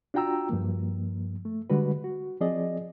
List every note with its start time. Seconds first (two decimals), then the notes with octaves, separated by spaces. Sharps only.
0.14 D4 F4 F#4 G5 A#5 E6
0.49 G2 F3 A#3
1.45 A3
1.70 D3 G3 G#3 F#4 B4
2.04 F#4
2.41 F3 C4 G#4 D5 D#5